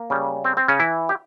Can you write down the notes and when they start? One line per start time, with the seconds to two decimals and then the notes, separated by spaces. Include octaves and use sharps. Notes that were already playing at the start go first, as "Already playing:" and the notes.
Already playing: A#3
0.10 C#3 G3
0.44 C4
0.57 C4
0.68 C#3 C#4
0.80 E3 E4
1.09 G4